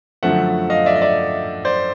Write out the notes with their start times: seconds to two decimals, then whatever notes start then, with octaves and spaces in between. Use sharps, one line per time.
0.23 F#2 D3 F3 A3 E5 F#5
0.70 D#5 F5
0.86 D5 E5
0.96 D#5
1.02 D5 E5
1.65 C5 D5